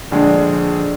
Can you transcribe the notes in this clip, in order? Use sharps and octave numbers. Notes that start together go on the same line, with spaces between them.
A#1 D3 G#3